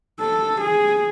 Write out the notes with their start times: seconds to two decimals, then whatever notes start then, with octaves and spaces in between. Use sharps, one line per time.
0.20 A4
0.61 G#4